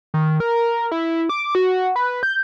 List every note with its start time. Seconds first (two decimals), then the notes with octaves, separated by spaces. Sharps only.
0.14 D#3
0.40 A#4
0.92 E4
1.29 D6
1.55 F#4
1.96 B4
2.23 G6